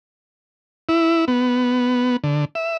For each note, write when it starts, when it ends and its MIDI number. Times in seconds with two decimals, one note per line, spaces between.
0.89 1.25 64
1.28 2.17 59
2.24 2.45 50
2.55 2.77 76